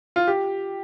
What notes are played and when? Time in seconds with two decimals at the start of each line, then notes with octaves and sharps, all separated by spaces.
0.16 F4
0.28 G4